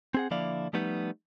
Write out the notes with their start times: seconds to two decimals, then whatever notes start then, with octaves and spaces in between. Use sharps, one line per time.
0.14 C4 G#4 F#5
0.31 D3 F3 A#3 E4 D5 F5
0.73 F3 G3 A3 B3 D#4